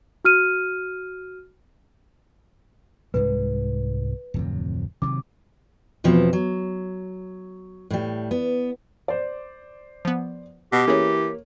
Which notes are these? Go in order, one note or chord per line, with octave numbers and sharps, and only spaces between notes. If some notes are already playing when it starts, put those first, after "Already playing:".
F#4 F6 D#7
C2 G#2 G#3 B4
D1 F2 C3
C3 D#3 F#3 D6
E2 B2 F3 C4
F#3
A2 G3
B3
C5 D5
F3 B3
B2 G4
E3 A#3 C#4 G#4 C#5